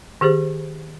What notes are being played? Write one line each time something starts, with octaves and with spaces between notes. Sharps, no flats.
D#3 G4 G#4 C5